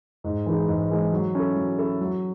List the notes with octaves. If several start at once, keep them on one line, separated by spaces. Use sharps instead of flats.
G#2
E3 G#3 D#4
G#2
E3 G#3 D#4
F#3
C#4 E4 A4
F#3
C#4 E4 A4
F#3